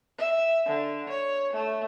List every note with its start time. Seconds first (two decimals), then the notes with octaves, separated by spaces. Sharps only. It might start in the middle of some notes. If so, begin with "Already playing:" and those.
0.19 E5
0.66 D3
1.09 C#5
1.53 A3